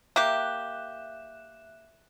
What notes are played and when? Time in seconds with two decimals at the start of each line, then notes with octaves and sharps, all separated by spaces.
0.16 A#3 G4 E5 F#6 E7